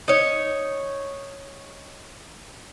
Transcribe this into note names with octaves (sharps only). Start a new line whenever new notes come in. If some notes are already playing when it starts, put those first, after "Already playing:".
D#4 C#5